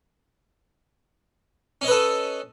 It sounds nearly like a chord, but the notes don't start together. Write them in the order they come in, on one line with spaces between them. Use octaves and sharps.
C#4 D#5 B4 A4